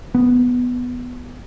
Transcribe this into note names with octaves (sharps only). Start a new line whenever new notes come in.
B3